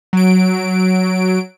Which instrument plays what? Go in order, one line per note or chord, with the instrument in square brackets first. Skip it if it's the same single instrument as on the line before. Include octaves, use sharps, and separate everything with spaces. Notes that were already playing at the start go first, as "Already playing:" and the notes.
[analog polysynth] F#3 D7